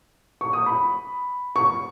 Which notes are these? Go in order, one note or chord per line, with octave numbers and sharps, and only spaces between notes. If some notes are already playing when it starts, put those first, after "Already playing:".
C#6
D#6
B5
C#6